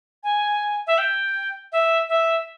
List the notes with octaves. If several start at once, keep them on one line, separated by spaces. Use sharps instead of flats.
G#5
E5
G5
E5
E5